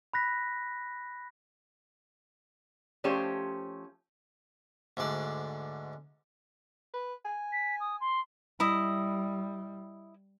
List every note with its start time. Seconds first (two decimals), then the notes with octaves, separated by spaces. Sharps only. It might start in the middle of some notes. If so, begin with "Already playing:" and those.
0.14 B5 F#6 A#6 B6
3.04 F3 A3 C#4 G4 C5 C#5
4.97 D2 G#2 D3 D5
6.94 B4
7.25 G#5
7.52 B6
7.80 D#6
8.01 C6
8.60 G3 E4 D#5